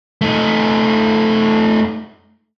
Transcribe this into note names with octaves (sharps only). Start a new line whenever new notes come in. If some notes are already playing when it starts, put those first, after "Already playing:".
A3 D#4